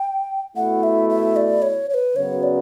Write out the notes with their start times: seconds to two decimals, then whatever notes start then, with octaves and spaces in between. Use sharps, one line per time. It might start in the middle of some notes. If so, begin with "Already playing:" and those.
Already playing: G5
0.56 B2 A3 E4 F#5
0.83 E5
1.10 E5
1.36 D5
1.62 C#5
1.90 C#5
1.94 B4
2.16 F#2 C#3 F#3 B3 C#5
2.43 D5